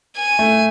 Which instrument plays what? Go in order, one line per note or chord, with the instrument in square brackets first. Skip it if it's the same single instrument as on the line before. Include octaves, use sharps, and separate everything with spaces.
[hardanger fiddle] G#5
[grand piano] A3